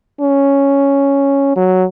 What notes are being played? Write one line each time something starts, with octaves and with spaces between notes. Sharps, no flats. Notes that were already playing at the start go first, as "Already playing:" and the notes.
C#4
F#3